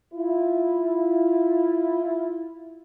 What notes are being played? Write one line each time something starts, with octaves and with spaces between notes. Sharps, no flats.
E4 F4